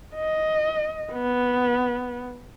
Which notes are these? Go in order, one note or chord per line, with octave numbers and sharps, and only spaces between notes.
D#5
B3